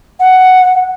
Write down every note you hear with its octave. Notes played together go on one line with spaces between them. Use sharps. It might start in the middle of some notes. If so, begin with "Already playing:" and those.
F#5